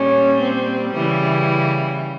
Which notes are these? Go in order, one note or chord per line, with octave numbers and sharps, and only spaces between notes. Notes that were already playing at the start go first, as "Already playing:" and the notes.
Already playing: A#2 G3 C#4
C4
C#3 E3 G3